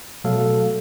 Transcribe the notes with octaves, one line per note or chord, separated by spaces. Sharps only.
B2 F#3 A3 A4 F5